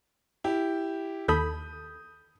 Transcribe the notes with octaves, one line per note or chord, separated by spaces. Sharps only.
E4 G4
D#2 A4 B5 D#6 G6